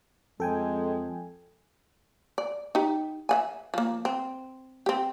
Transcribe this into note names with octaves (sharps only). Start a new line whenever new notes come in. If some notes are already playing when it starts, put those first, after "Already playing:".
F2 G#3 A4 G5 G#5
D5
D#4 G4
E5 F#5 G#5
F3 A#3
C4
C4 G4